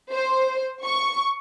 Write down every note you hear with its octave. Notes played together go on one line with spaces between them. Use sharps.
C5
C#6